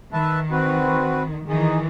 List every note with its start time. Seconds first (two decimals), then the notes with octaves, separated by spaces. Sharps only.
0.13 D#3 B4 E5 A5
0.51 C4 F#4 B4
1.48 D#3 E3 D#4 G#4